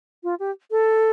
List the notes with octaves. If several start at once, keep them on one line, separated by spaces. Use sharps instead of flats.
F4
G4
A4